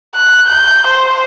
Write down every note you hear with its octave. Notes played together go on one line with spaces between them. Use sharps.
F#6
G6
C5